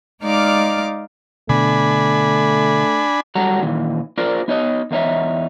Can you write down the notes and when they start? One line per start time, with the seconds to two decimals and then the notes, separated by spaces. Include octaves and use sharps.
0.23 G#3 D#4 D5 F5 D6 F6
1.49 B2 D3 A3 B3 D4 G#5 B5
3.35 F#3 G3 G4 A4 F#5 A#5
3.62 A#2 D#3 E3
4.18 F4 G#4 A#4 C5 D5
4.48 B3 D#4 C#5 D#5
4.91 E2 A#3 D#4 C#5 E5